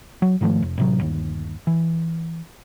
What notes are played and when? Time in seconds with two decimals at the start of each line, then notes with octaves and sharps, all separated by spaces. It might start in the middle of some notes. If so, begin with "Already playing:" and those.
0.22 F#3
0.41 G#2 D#3 F3 A3
0.62 F1
0.78 A1 C3 F#3
0.98 G1 D#2
1.67 E3